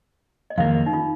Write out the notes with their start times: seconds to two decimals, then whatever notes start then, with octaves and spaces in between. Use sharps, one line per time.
0.50 D#5
0.58 F2 D#3 A#3 F5
0.86 D#4
0.93 F4